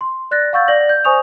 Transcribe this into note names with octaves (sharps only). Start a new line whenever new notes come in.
C6
D5 F#6 A6 A#6
F5 F#5 C#6 E6 G6 A6
D5 A#6 F#7
G6
C5 G#5 C#6 D#6 F7